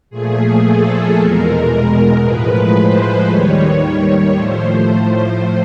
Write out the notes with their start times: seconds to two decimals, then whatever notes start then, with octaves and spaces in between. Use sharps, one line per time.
0.10 A#2 F3 A3 G#4
0.63 A4
1.16 E2 B2 G#3 A#4
2.21 A2 F3 G#3 B4
2.74 C5
3.28 D#2 D#3 G3 C#5
4.33 A2 F3 A3 C5